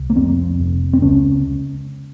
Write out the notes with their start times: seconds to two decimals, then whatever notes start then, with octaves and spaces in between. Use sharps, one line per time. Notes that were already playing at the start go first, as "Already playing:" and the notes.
Already playing: C2
0.10 A#3
0.16 F2 C4
0.59 F1
0.93 C4
1.02 C#2 C#4